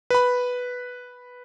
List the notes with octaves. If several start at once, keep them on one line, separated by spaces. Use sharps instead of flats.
B4 B5